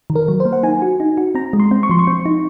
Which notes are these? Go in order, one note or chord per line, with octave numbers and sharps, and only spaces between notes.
D#3
A#4
F#3
C5
A#3
F#5
D#4 G#5
F#4
D#4
F#4
C4 A#5
G#3
C6
C4
C#6
F3 C6
C#6
C4
D#4